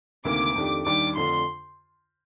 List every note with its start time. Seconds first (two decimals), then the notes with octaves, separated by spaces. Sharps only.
0.25 D2 C3 D#3 A#3 D6
0.56 F2 D#3 A3 D4 G4
0.86 D#2 D#3 G3 D4 G4 D6
1.17 F2 D3 A3 D4 F4 C6